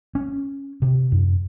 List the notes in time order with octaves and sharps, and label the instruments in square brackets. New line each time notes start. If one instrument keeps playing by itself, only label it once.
[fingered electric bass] C#4
C3
F#2